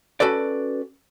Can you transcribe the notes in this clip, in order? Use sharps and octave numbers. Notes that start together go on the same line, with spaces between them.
C#4 F#4 A4 B4 D5